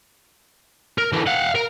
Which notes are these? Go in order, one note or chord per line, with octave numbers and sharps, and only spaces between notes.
A#4
D3 E3
F5 F#5
A#4